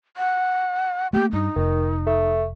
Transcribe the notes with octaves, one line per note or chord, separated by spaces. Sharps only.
F#5
A3 A#3 G4
G2 D#4
F1 D#3
A3